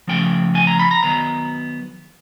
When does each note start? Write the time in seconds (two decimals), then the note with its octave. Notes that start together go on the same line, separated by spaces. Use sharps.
0.08 C#3 F3 A3 G5
0.55 G#5
0.67 A#5
0.79 B5
0.91 A#5
1.03 D#3 F#3 B3 A#5